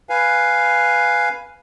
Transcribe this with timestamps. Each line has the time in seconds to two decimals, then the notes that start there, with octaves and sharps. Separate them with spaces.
0.09 B4 F5 G#5